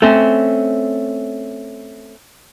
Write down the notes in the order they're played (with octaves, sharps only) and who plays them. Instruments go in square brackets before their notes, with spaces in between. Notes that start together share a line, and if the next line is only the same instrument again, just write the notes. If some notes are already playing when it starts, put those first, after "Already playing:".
[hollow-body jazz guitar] A3 C4 C#4